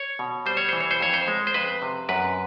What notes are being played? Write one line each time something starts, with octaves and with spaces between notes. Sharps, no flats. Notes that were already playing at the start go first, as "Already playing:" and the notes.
Already playing: C#5
B2
G3 C5
C#5
E3 C5
C#5
C5
F2 C#5
C5
G#3
C5
F2 B4
C3
F#2 B4